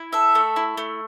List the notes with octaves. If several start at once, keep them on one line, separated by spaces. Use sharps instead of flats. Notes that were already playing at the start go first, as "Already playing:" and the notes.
Already playing: E4
A4 E5
A3
E4
A3